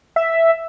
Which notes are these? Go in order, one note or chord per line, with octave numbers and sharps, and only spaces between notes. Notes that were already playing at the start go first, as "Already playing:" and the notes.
E5